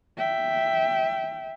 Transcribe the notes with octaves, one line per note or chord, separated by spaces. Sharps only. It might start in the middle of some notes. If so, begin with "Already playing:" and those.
E5 G5